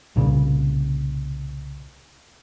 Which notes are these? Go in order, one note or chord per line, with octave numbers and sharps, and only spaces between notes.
C2 A#2 C#3